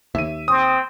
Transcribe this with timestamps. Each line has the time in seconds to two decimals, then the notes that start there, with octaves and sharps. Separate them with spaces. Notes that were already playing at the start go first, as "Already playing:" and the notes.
0.15 D#2 E5 D#7
0.48 C4 D#6